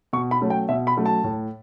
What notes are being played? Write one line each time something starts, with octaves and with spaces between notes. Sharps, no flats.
B2 C#6
B5
F#3 A3 C#4
G5
B2 E5
B5
F#3 A3 C#4
A5
A2